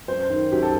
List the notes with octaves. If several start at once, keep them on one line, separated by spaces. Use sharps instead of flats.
F#2 C5
D#3
F#2 G4
A4